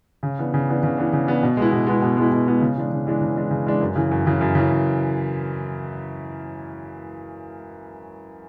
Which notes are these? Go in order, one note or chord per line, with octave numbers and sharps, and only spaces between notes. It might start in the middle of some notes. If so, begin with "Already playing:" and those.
C#3
E3 B3 D4
C#3
E3 B3 D4
C#3
E3 B3 D4
C#3
E3 B3 D4
B2
G#3 B3 E4
B2
G#3 B3 E4
B2
G#3 B3 E4
B2
G#3 B3 E4
C#3
E3 G#3 D4
C#3
E3 G#3 D4
C#3
E3 G#3 D4
C#3
E3 G#3 D4
F#2
C#3 E3
F#2
C#3 E3
F#2
C#3 E3
F#2